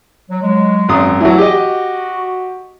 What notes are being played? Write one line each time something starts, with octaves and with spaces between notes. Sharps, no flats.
F#3
F#3 G#3
G#1 F#2 D#6
E3 F#3 A3
F#4 G4 D#5